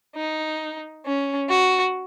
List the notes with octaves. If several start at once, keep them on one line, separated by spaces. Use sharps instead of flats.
D#4
C#4
F#4